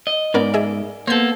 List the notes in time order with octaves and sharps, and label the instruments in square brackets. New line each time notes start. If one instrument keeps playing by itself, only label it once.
[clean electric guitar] D#5
[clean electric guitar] G#2 D5 [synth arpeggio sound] B3 C#4 A#4
[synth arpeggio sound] G#4 D#5 E5
[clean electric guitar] A#3 B3 A4 [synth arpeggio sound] C5 G6